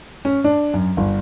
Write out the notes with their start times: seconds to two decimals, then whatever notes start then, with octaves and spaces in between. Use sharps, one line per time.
0.25 C#4
0.44 D4
0.74 F#2
0.97 G1